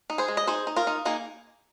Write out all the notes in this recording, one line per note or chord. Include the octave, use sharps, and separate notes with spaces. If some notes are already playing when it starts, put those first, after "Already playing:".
D#4
G#4 C5
G#3
D#5
D#4 G#4 C5
D#4
F4 A#4
D#4
A#3 D#4 G#4